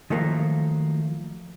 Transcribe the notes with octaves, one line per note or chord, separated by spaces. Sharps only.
D#3 F3 F#3 A3 A#3